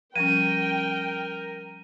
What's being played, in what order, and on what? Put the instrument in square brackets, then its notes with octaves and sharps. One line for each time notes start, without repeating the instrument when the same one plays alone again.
[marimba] F3 G3 C#4 [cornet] A#4 [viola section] G5 [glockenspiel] D#7